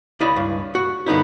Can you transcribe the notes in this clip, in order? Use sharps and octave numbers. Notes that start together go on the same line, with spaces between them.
C#2 E4 D5 D#5 B5
C#2 G2
F#4
G2 D3 B3 D#4 E4